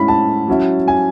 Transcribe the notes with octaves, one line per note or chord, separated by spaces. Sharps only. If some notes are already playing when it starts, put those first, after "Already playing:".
Already playing: A2 G#3 C#4 E4 B5
A5
F#3 C#4 E4
G#5